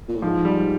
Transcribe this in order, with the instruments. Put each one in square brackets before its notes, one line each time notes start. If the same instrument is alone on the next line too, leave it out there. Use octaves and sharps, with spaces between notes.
[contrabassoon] A#2
A2
[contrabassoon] G#2 [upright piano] F3
[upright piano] G3